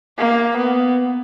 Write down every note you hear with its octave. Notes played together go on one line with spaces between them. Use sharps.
A#3
B3